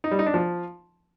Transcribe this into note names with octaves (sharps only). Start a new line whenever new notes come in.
D#4
G3
D#4
D4
F3